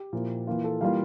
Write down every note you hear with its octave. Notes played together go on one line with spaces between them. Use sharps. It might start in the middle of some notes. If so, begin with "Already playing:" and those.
Already playing: G4
A#2 F3 A#3 E4
E3 A#3 F4
A4
E3 G3 A#3 F4 F5